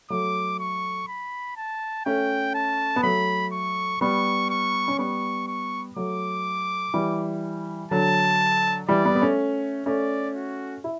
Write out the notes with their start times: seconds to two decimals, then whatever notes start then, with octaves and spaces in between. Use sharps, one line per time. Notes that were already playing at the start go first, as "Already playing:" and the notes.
0.10 F#3 A3 D6
0.59 C#6
1.08 B5
1.57 A5
2.06 A3 C#4 G5
2.55 A5
2.96 B3
3.03 F#3 A3 B5
3.52 C#6
4.01 G3 B3 C#6
4.50 C#6
4.88 C#4
4.99 G3 B3 C#6
5.48 C#6
5.96 F#3 A3 D6
6.94 E3 G3
7.91 D3 F#3 A5
8.89 E3 G3 D5
9.05 G3 B3
9.15 B3
9.22 A3 C#4
9.86 A3 C#4 D5
10.36 F#4
10.84 E4